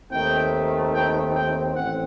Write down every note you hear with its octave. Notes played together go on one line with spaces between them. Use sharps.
D#2 D#3 A3 C4 D#4 G5
G5
G5
A1 C4 F#5